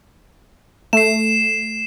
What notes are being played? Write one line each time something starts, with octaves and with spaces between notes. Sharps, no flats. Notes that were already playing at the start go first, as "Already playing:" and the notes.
A3 C7 E7